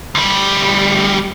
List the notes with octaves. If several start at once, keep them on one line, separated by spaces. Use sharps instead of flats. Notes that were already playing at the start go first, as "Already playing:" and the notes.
D2 G3